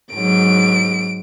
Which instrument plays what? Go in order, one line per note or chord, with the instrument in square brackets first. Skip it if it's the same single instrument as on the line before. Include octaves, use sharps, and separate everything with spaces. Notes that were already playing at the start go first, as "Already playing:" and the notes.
[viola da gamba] G#2 F#3 [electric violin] D7